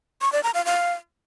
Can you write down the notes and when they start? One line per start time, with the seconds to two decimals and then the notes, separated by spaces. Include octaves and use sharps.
0.22 C#6
0.32 D5
0.43 A#5
0.54 F5
0.65 F5